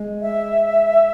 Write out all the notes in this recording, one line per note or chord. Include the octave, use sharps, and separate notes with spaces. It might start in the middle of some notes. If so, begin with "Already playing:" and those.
Already playing: G#3
E5